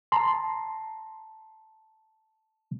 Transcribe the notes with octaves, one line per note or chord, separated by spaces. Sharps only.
A5 A#5 C6